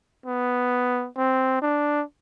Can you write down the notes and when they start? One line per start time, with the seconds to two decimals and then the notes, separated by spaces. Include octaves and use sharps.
0.26 B3
1.17 C4
1.62 D4